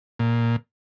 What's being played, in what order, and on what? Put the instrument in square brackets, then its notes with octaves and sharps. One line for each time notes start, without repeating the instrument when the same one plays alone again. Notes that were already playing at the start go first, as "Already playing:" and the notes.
[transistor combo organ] A#2